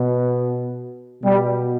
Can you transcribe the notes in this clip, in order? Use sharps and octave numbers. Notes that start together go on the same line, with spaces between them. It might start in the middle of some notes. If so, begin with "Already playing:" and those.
Already playing: B2
B2 G3